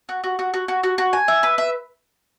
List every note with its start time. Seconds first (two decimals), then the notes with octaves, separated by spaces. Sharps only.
0.09 F#4
0.24 F#4
0.39 F#4
0.54 F#4
0.68 F#4
0.83 F#4
0.98 F#4
1.13 G#5
1.28 E5
1.43 B4
1.58 E5